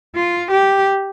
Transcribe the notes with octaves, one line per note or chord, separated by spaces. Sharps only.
F4
G4